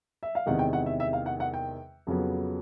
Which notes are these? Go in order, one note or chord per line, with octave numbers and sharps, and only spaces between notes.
E5
F5
E2 C3 D#3 G#3 F#5
G5
F#5
E5
E5
F5
F#5
F#5
G5
F2 C#3 F#3 B3